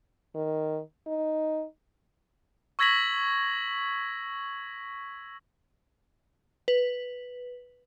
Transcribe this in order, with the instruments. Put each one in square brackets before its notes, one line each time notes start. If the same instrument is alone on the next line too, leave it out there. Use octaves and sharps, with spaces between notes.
[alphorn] D#3
D#4
[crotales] C#6 E6 G#6 A#6 B6 F#7
[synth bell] B4